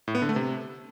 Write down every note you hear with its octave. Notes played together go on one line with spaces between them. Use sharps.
A2
B3
D3
A3
C3